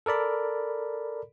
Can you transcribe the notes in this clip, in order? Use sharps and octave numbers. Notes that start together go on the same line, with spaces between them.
A4 A#4 D5 B5